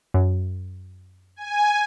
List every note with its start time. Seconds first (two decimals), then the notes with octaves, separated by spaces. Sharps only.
0.14 F#2
1.36 G#5